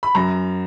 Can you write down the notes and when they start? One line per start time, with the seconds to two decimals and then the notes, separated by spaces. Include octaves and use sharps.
0.03 B5
0.15 F#2 A#5